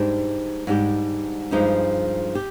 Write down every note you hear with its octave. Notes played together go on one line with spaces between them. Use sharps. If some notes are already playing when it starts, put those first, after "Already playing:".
Already playing: G#2 G3 D4 G4
G#2 G3 D4 G4
G2 F3 G#3 D#4 G4
G4